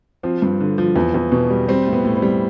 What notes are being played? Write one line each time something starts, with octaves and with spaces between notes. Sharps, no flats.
F3 C4
G2
D3
F3
E2
E2
B2
G3
G3 C4
A2
B3
A2
C4
G3